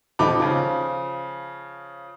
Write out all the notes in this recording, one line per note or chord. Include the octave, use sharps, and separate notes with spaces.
D#1 F3 D#4 B5 D6
C#3 F3